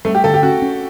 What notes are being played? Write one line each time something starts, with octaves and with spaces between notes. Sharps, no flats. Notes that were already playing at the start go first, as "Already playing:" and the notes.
G3 A3
G4
D3 A4
G4
C#4 F#4
C#4